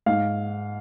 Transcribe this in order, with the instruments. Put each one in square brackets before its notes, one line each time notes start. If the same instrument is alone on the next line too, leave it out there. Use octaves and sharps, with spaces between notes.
[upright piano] G#2 F5